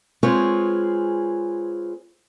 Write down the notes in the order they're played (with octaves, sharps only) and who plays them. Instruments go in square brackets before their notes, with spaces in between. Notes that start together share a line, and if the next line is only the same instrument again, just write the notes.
[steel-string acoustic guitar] G#3 C4 F4 G#4 B4 C#5